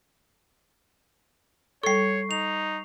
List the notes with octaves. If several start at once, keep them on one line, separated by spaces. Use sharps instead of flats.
G3 A4 C#5 C#6 C7
D#4 F7